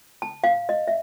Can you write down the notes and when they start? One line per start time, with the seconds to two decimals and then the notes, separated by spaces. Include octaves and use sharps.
0.22 A5
0.44 F5
0.69 D#5
0.88 E5